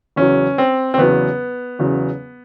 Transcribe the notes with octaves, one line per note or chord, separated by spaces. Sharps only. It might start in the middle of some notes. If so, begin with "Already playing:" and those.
E2 C#3 F#3 C#4
C4
C4
E2 C#3 F#3 B3
E2 C#3 F#3